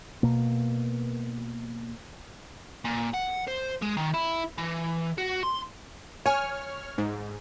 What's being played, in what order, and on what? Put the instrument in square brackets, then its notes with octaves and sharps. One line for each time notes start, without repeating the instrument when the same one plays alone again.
[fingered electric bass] B2 A#3
[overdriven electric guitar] A#2
F#5
C5
G#3
D#3
E4
E3
F#4
C6
[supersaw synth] C#5 F6 [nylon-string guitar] G#5
[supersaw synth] G#2